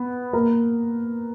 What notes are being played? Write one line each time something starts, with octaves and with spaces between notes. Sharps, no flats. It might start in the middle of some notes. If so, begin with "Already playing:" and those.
Already playing: B3
A#3 A#4